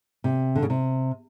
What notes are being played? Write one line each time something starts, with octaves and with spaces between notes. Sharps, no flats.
C3
D3
C#3
C3